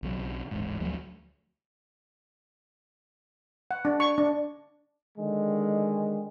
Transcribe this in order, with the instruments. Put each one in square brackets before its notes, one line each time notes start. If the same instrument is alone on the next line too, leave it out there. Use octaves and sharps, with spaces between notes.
[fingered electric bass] B1 C#3 F#3
D1 A1 G#2
D2 F3 F#3 A3
[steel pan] F#5
D4
C#6
D4
[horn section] D3 D#3 G#3